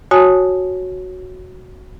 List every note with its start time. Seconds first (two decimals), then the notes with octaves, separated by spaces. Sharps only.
0.11 F#4 C#5 G#5 A5 D#6